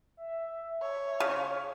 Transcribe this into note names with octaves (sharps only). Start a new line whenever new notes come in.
E5
C#5
C#3